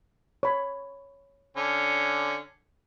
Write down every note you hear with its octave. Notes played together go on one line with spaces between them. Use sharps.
C#5 B5
D3 C#4